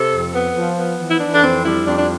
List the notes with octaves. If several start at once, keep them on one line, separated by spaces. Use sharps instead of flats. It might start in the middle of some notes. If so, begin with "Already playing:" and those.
Already playing: C3 A4
F2
B3
F3
B3
E3
E4
E3 D4
D4
F2 C4
G3 E4
F2 D4
D4